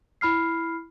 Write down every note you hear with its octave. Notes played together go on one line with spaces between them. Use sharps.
E4 B5 F6 C7